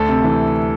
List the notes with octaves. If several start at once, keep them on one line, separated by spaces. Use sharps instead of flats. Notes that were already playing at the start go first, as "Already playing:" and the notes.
Already playing: D2 A4
C3
E3